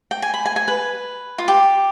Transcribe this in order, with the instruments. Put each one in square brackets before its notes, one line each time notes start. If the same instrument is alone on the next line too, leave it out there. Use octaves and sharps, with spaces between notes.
[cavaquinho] G5
G#5
B5
G#5
G#5
B4
F4
G4